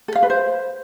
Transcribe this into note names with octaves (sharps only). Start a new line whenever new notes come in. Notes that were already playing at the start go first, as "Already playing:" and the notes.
A4
F5
B4
C5